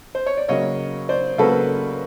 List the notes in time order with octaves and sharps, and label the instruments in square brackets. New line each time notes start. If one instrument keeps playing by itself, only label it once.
[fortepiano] C5
C#5
D5
C#3 F#3 A#3 C#5 D#5
C5 D5
C#3 F#3 A#3 A4 B4